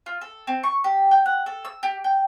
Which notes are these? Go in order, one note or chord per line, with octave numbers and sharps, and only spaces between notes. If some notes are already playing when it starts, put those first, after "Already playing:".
F4
A4
C4
C#6
G4
G5
F#5
A4
E6
G4
G5